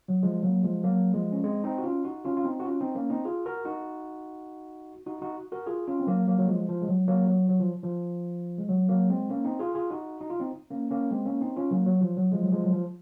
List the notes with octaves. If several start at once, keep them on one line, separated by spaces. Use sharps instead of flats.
F#3
F3 G#3
F#3 A#3
F3 G#3
F#3 A#3
F3 G#3
C#4
G#3 C4
C4 D#4
F#4
C#4 F4
D#4 F#4
C#4 F4
F4
C4 D#4
F#4
C#4 F4
C4 D#4
A#3 C#4
C4 D#4
F4 G#4
F#4 A#4
D#4 F#4
D#4 F#4
D#4 F#4
F#4 A#4
F4 G#4
C#4 F4
C4
F#3 A#3
F#3 A#3
F#3
F3 G#3
F3
G#3
F#3
F#3 A#3
F#3
F#3
F3
F3
G#3
F#3
F#3 A#3
G#3 C4
A#3 C#4
C4 D#4
F4 G#4
F4 G#4
D#4 F#4
D#4
F4
C4 D#4
A#3 C#4
A#3 C#4
G#3 C4
A#3 C#4
C4 D#4
C#4 F4
F#3 A#3
F#3
F3
F#3
F3 G#3
F#3
F3 G#3
F#3
F3